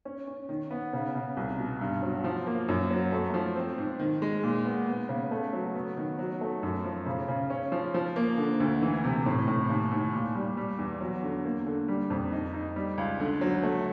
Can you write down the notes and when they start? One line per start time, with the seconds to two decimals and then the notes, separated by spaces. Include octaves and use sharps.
0.05 C#4
0.27 C#4
0.49 D#3
0.71 B3
0.93 C#3
1.15 C#3
1.37 C2
1.59 B2
1.81 G2
2.02 F#3
2.24 F3
2.47 A#3
2.68 F#2
2.91 F#3
3.12 A3
3.34 F3
3.56 C4
3.78 G#2
4.00 D#3
4.22 G#3
4.43 A#2
4.65 B3
4.87 B3
5.09 C#3
5.31 A3
5.53 F#3
5.75 B3
5.97 D#3
6.19 F#3
6.41 A3
6.63 F#2
6.84 F3
7.06 C#3
7.28 C#3
7.50 C#4
7.72 F3
7.94 F3
8.16 A#3
8.38 D3
8.60 D2
8.81 E3
9.04 C3
9.26 A2
9.48 A2
9.69 D#2
9.91 D#2
10.13 A#2
10.35 G3
10.57 G3
10.79 E2
11.01 F#3
11.23 D3
11.45 A#3
11.66 D3
11.88 G3
12.10 F2
12.32 D#4
12.54 D#4
12.76 G3
12.98 C#2
13.20 D3
13.41 F#3
13.63 A3